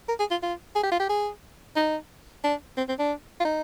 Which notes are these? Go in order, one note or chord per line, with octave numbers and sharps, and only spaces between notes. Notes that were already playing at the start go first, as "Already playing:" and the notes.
A#4
G#4
F4
F4
G#4
G4
F4
G4
G#4
D#4
D4
C4
C4
D4
F4
D#4